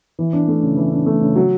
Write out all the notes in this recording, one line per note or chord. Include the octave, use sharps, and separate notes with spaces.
E3
D4
A3
C#3
E3
D4
A3
C#3
F#3